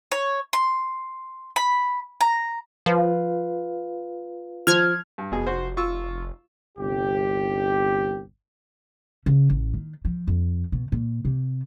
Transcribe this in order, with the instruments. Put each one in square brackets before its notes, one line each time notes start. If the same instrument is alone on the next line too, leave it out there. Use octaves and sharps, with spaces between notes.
[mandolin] C#5
C6
B5
A#5
[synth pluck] F3 [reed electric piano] F4 B4 F5
[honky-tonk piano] F3 [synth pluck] F6 G#6
[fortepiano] G2
[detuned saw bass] F1 [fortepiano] B2 G#4
[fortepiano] F#4 C5
F4 C#6 E6
[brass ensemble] G1 C2 G4
[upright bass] C#3
A1
D#3
F3
F2
B2
A#2
C3